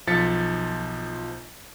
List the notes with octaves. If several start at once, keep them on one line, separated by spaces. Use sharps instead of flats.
B1 F3 A6 B6 C#7